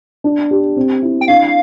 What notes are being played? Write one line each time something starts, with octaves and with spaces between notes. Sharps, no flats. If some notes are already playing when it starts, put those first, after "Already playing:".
D4
G4
C4
E4
G5
D4 F5